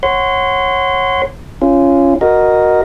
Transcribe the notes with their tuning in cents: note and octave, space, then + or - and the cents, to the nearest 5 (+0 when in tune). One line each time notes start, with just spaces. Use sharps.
C#5 -20 F#5 +0 C6 -30
C#4 +0 F4 -20
F#4 +0 A#4 +5 D#5 -5